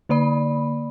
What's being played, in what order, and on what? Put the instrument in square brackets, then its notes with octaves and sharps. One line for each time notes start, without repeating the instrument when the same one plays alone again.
[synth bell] D3 A#3 D5 B5